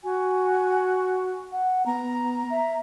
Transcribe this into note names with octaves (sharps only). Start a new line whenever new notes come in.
F#4 G#5
F#5
B3 A#5
E5